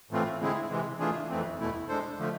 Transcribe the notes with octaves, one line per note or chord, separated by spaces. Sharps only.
A2 E3 A3 C4 F4
D3 G#3 C4 E4 G#4
C3 E3 G#3
E3 A3 D4 F4 G#4
F2 E3 A3 C4
E2 B2 A3 E4
G#3 D4 A4 C5
D3 F3 A3